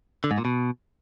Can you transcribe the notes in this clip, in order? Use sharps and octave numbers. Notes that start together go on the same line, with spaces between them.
D3
G#2
A#2
B2